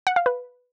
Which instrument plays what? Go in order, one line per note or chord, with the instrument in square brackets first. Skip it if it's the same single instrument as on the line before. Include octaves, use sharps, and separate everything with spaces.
[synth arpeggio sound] F#5
F5
B4